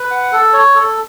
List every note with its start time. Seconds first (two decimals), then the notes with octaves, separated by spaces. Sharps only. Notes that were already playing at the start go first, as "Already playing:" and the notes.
Already playing: B4
0.11 F#5
0.32 A4
0.53 C#5
0.75 A4